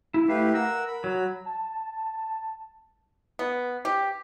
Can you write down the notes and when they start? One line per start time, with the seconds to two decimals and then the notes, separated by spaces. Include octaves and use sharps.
0.14 E4
0.28 A3 E4 G4 B4 F5
0.54 A#4 F#5 E6
0.88 B5
1.04 F#3
1.45 A5
3.39 B3
3.85 G4